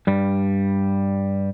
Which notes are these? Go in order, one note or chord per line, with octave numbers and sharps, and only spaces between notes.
G2 G3